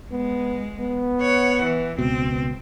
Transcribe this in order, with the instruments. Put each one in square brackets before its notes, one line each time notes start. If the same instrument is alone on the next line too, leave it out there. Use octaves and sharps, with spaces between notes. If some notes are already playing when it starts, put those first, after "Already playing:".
[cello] G#3 [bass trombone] B3
[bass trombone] B3
[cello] C#5 F#5
E3
[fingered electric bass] C#2 B2 [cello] C4